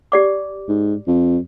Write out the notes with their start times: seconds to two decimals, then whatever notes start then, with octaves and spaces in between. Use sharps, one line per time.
0.12 G4 D5 D6
0.69 G#2
1.07 F2